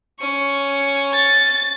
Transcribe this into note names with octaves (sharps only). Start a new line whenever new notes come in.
C#4 C#6
A6